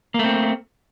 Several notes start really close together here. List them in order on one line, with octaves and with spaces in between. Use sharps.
A#3 A3 C4